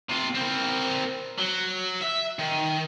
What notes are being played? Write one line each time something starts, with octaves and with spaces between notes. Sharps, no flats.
C3 F4
C4 A#4
F#3
E5
D#3